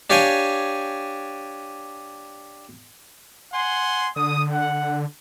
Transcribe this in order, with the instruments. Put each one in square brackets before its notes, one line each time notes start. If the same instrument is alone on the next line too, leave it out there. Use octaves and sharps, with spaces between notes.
[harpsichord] D4 G4 C#5 F5 G5 G#5
[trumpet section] F#5 G#5 C6
[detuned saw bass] D3 [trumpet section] D#6
[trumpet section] F#5